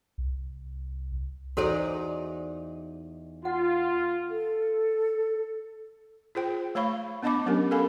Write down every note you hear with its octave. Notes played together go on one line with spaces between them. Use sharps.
C2
E2 D#4 F#4 A4 C5 D5
F4 F#5
A4
F4 G#4 C5 G5
A3 C#5 F5 B5 C#6
B3 D4 D#5 A5 B5 D6
F#3 B3 C#4 D4 G4 A#4
A4 A#4 F5 G#5 B5